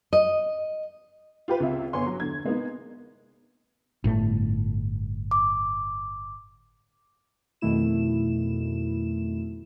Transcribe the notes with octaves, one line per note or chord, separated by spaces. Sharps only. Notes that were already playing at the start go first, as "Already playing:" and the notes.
D#5
F4 G4 B4
C#2 C3 F4 E5
G1 B3 C#5 G#5 C6
F#3
E2 D3 G#6
C3 G#3 A#3 B3 D#4
G1 A2 A3
D6
F2 B2 D#3 A3 E4 E7